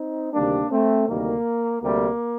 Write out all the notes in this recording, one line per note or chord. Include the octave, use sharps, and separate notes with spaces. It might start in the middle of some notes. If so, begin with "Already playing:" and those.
Already playing: C4 D#4
D2 C3 D#3 G3 A#3 D4
A3 C4
D2 C3 D#3 G3 A#3
D2 C3 G3 A#3